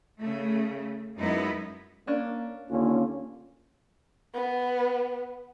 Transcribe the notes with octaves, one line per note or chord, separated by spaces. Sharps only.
C#3 A3
F#2 G#3 B3 D#4 E4
A#3 C#4 D4
D#2 D3 A#3 C#4 F4
B3